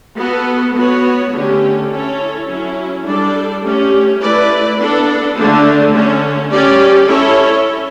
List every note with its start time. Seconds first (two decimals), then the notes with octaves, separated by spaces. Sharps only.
0.18 B3 F#4 A4
0.76 B3 F#4 C#5
1.33 D3 A3 C#4 G4
1.90 C#4 E4 A4 C#5
2.49 F#3 C#4 E4
3.05 G3 D4 A4 D5
3.64 A3 C#4 G4
4.21 A3 E4 B4 D5
4.79 B3 D4 A4
5.36 D3 A3 D4
5.93 D3 A3 C#4
6.51 G3 C#4 G4 D5
7.08 C#4 E4 A4 C#5